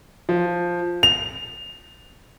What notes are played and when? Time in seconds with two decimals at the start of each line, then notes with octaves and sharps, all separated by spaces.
0.29 F3
1.03 F7